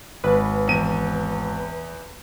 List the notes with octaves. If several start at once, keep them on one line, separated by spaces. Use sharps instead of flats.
G#1 B4
E2 D#7